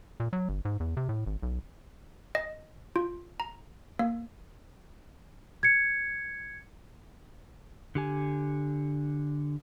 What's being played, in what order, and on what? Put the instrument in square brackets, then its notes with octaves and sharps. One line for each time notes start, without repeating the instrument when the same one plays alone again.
[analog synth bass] A#2
F#3
G1
G#2
E2
C3
A2
G#1
B1
[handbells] D#5
F4
A#5
A#3
[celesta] G#6 C#7
[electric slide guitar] D3 G4 G#5